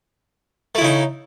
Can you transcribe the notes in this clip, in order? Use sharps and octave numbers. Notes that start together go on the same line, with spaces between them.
C#3 A3 D#4 E4